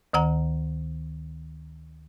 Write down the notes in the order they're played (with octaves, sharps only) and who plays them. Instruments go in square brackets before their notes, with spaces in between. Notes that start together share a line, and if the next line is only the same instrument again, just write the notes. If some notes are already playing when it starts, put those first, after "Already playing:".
[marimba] D2 D#3 F#5 A#5